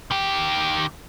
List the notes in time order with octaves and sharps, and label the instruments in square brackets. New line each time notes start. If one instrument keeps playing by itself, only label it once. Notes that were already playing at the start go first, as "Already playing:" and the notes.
[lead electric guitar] D#3 G4